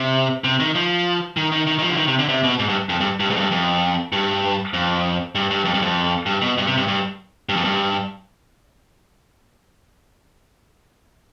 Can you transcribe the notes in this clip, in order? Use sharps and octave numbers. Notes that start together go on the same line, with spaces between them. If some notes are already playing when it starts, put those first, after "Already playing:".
Already playing: C3
C3
D#3
F3
D#3
D#3
D#3
D#3
F3
D3
D#3
C3
D3
C3
B2
G#2
G2
F2
G2
G2
G#2
F2
G2
F2
G2
F2
G2
G2
F2
G2
F2
G2
B2
G2
C3
G2
G2
G2
F2
G2